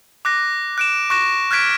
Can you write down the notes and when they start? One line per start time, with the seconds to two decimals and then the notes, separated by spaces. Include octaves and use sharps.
0.25 D6 F#6 A#6
0.78 F#6 D7 E7
1.10 C#6 F#6 A#6 E7
1.51 F6 F#6 G#6 B6 D7